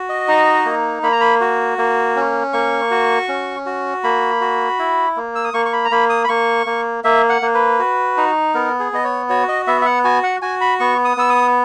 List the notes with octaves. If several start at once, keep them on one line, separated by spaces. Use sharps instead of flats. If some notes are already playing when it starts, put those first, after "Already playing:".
Already playing: F#4
D#5
D#4
A#3
A#3 B5
A#5
B5
F#4
A#3
C#4
A#3 C#6
F#4
C#4
F#4
A#3 B5
F#4
E4
A#3
E6
D#6
A#3 C#6
C#6
B5
A#5
A#3 B5
D#6
B5
A#3 C#6
A#3
A#3 E5
F#5
A#3
B4
F#4
D#4
B3 A#4
G#4
B3 D#5
C#5
F#4 C#5
D#5
B3 E5
E5
F#5
F#4 G#5
F#5
F#4 G#5
B5
B3 C#6
D#6
B3 E6
D#6